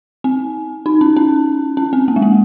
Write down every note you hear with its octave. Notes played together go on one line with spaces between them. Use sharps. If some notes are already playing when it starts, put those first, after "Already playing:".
C4
D#4
C#4
C#4
C#4
C4
A#3
G#3
A#3